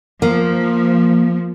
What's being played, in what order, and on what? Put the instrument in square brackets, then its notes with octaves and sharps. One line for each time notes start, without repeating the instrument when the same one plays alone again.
[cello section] F3 [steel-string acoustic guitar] A#3